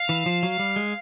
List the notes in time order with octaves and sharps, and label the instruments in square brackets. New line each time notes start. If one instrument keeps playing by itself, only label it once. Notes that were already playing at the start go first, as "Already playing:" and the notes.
Already playing: [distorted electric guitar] F5
[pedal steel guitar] E3
F3
F#3
G3
G#3